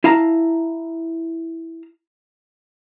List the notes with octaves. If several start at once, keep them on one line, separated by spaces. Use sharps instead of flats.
E4 F5 A5 A#5